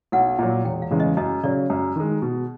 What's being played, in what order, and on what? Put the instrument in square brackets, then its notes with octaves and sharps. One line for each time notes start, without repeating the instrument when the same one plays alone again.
[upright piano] B1 [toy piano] F#5
[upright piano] A#2 F#3
[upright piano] E1 [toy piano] G5
[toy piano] F5
[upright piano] E2 C#3 E3 G#3
[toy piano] D#5
[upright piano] F#2 [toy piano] D#5
[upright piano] C#3 F#3 [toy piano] D5
[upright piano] F#2
D#3 G#3
B2